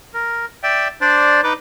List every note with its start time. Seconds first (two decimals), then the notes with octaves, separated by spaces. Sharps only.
0.14 A#4
0.63 D5 E5 G5
1.01 D4 C5 D5
1.44 D#4 B4 D6